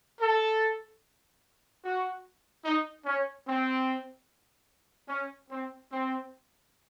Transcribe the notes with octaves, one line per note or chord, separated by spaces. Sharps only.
A4
F#4
D#4
C#4
C4
C#4
C4
C4